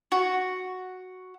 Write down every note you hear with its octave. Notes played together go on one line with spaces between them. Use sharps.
F#4